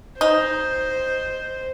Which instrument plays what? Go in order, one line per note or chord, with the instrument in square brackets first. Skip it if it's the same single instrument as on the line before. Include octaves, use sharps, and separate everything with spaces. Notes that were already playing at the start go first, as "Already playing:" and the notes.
[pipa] D#4 [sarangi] C5